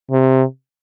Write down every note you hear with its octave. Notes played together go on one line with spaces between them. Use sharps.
C3